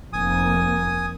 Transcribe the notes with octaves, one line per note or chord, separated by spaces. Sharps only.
F1 A#3 G#5 D#6